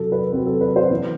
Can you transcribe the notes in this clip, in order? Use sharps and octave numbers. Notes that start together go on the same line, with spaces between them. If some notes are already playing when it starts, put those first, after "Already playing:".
Already playing: C3 F#3 C4 A4
B4
C3 F#3 C4 B4
A4
B4
C5
E3 B3